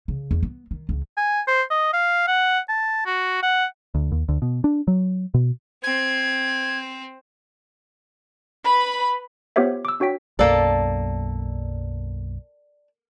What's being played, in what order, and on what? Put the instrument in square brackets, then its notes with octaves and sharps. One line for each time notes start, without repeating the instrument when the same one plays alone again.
[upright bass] C#3
E2
B3
D#3
C#2
[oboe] G#5
C5
D#5
F5
F#5
A5
F#4
F#5
[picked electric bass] D2
D#2
D2
B2
D4
F#3
B2
[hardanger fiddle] C4 C5 [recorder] G#6
[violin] B4 B5
[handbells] B3 F4 G4 C5 C#5 E5
D6 E6
D4 F#4 C#5 G5 B6
[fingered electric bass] B1 F#2 [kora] A#3 A4 [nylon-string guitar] D5 G5 A5